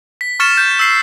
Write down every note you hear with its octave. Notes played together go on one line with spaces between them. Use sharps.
B6
C#6 F6 A6 C#7 E7
G6
E6 C7